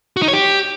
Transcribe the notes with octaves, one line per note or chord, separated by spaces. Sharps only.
F#4
D#4
C#5
G4